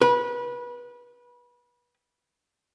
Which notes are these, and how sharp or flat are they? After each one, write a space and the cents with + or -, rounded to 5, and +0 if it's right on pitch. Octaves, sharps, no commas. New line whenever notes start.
B4 -25